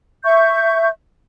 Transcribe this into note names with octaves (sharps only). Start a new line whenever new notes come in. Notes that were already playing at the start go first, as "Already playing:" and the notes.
E5 C#6 G6